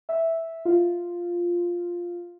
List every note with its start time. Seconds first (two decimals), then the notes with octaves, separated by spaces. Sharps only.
0.09 E5
0.65 F4